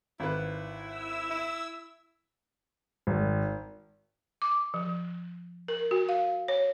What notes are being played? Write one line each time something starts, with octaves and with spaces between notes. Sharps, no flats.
G#1 E4 B4
E6
E4
G#1
D6
F3
A#4
F#4
F5
C#5